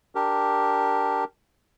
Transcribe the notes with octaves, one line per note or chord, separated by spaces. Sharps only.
D4 G4 A#4